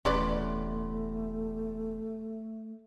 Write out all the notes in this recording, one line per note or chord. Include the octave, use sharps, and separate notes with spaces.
D#1 E2 C3 A3 C#4 B4 D5